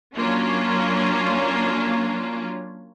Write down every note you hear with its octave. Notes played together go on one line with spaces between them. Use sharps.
F#3 A#3 C#4 D4 F4